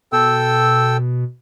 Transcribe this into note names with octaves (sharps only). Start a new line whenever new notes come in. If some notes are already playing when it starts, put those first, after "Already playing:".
B2 A4 G5 E6